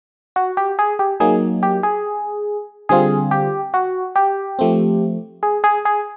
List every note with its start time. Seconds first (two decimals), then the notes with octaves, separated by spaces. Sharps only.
0.36 F#4
0.57 G4
0.79 G#4
0.99 G4
1.20 F#3 A#3 D#4 G#4
1.63 G4
1.83 G#4
2.89 D3 G3 C4 F4 G#4
3.31 G4
3.74 F#4
4.16 G4
4.59 F3 A3 C4
5.43 G#4
5.64 G#4
5.85 G#4